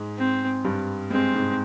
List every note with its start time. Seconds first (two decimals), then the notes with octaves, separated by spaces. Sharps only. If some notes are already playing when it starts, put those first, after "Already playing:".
Already playing: G#2 G#3
0.18 C4
0.64 G2 G3
1.10 G#3 C4
1.35 G#2 G#3